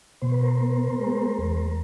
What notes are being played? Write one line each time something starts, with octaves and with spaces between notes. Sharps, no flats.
B2 C5
B4
A#4 C5
B3
G#3 A#4 C5
E2